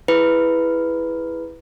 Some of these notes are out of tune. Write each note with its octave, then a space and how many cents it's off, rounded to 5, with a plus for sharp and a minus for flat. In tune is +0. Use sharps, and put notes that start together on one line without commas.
E4 +0 G#4 +0 B4 +0